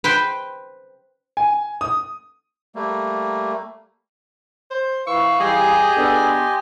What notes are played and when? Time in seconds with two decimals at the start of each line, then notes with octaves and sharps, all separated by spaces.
0.04 B4 C5 G5
1.37 G#5
1.81 D#6
2.75 G3 A3 A#3
4.71 C5
5.07 F3 E4 B4 F5 C#6 E6
5.40 E3 G3 G4 G#4 D#5 G#5
5.96 B3 D4 A4
6.27 C6